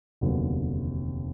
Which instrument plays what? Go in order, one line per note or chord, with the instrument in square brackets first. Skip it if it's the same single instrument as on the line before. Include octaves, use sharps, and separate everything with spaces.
[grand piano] F1 D#2 D3 F#3 B3